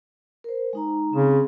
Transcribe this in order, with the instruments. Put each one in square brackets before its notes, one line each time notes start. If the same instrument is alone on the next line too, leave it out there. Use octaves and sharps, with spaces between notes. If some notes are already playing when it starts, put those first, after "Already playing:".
[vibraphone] A#4 C5
G#3 D#4 A#5
[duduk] C#3 [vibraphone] C4 C6